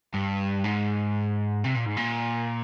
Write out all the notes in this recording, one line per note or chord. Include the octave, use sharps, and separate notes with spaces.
G2
G#2
C3
A#2
G#2
A#2